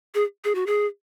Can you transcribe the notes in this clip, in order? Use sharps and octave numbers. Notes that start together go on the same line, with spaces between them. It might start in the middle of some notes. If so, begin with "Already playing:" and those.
G#4
G#4
F#4
G#4